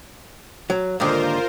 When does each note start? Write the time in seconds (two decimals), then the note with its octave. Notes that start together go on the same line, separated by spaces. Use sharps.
0.70 F#3
1.00 D#2 G#2 D3 F4 A#4 C5